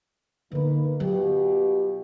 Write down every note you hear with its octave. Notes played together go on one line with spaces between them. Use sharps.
D3 A#3 B3 D#4 B4
B2 F#3 F4 G4